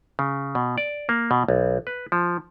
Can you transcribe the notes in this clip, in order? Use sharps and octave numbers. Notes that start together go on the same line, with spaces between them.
C#3
B2
D5
A#3
B2
B1
B4
F3